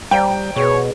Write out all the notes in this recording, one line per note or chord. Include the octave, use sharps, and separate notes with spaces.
G3 C5 D5 G5 A#5
B2 G#4 B4 C#5